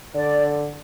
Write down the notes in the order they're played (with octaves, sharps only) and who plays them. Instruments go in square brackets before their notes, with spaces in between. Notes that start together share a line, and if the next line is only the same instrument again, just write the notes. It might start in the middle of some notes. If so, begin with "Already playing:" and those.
[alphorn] D3 [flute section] D5